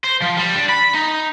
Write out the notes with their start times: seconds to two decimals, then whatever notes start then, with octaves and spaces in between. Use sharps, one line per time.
0.04 C5
0.22 F3
0.37 G3
0.56 D4
0.69 B5
0.94 D#4